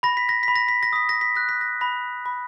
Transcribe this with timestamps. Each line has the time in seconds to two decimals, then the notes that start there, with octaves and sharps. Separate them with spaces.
0.03 B5 A#6
0.17 B6
0.29 A#6
0.43 B5 B6
0.56 A#6
0.68 B6
0.83 A#6
0.93 D#6 B6
1.09 A#6
1.21 B6
1.36 F#6 A#6
1.49 B6
1.61 A#6
1.81 B5 A#6
2.26 B5